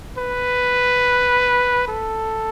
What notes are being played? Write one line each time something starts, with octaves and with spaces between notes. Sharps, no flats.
B4
A4